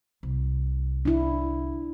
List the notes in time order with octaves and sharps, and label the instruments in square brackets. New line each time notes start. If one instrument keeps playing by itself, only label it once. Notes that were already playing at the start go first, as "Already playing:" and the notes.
[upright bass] C2
[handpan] D4 E4